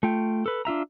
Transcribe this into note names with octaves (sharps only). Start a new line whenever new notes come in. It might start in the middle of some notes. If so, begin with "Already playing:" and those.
A3 F4 G5
A4 B4
D4 F4 E5 A#5